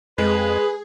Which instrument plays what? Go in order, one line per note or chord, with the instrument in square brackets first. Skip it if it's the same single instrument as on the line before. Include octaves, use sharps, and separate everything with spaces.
[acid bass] F2 [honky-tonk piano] G#3 [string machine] G#4 [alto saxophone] B4